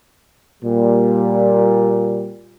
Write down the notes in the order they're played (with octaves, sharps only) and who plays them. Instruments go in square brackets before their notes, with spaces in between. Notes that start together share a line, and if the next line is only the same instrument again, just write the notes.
[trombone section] A#2 G3